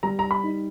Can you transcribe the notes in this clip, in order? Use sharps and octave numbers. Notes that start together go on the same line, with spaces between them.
G3 A#5
A#5
B5
D#4